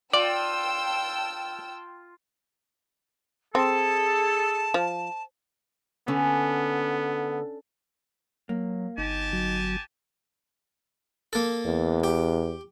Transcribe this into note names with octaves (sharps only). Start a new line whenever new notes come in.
F4 D5 G5 A5 E6
C4 G#4 A4 A5
F3
D3 B3 C#4
F#3 A#3
G1 D#4 G4 G#5 A5
F#3
A#3 A4
E2
G4